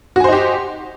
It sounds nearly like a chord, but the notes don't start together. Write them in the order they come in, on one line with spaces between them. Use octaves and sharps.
F#4 G#5 C5 D#4 G4